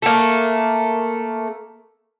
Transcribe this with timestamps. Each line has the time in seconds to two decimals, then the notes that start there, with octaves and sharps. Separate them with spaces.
0.02 A3 A#3